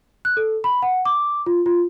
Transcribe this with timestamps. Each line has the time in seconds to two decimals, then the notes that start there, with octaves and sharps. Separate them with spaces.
0.25 F#6
0.37 A4
0.64 B5
0.82 F#5
1.05 D6
1.46 F4
1.66 F4